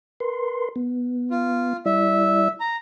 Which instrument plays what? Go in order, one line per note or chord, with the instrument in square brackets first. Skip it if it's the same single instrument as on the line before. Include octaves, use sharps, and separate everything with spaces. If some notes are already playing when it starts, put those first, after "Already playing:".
[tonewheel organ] A#4 B4 C6
B3
[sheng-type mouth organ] F4
[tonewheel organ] G3 E4 D5 [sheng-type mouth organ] E5
[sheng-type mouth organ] A#5